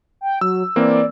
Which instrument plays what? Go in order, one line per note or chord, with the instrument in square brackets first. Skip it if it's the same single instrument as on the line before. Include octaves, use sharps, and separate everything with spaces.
[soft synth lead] G5
[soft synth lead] F#3 [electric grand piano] E6
[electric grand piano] E3 A#3 C4 [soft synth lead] D5